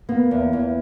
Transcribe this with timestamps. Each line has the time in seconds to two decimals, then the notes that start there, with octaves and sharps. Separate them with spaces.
0.09 A#3 B3
0.31 E2
0.53 E2